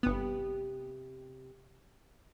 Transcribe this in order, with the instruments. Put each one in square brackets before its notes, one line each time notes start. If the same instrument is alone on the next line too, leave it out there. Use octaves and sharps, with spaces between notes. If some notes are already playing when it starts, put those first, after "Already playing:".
[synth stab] G1 B3 [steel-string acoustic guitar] C3 G4